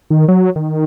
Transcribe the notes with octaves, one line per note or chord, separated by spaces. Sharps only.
D#3
F#3
D#3